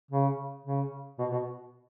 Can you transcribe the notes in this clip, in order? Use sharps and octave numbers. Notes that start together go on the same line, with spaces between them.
C#3
C#3
B2
B2